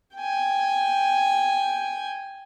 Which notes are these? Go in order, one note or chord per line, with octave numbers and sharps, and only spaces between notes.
G5 G#5